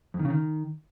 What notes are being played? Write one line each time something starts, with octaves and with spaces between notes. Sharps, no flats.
F2
D#3
C#3
D#3